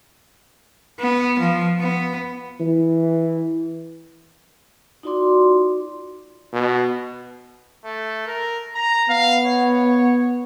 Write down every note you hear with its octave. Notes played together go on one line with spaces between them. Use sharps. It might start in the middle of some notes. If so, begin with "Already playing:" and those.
B3
F3
B3
E3
D#4 F4 F#4 D5 C6 D6
B2
A3
A#4
A#5
B3 F5
C#5